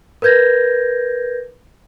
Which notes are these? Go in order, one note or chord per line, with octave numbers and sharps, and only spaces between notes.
A#4 B4 G6 G#6 A#6